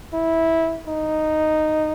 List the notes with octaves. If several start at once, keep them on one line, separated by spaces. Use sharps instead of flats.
E4
D#4